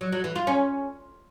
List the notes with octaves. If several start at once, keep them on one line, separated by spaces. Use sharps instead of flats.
F#3
F#3
E3
F4
C#4